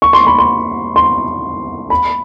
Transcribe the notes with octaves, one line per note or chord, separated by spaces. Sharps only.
C#6
C6
B5
C6
C6
B5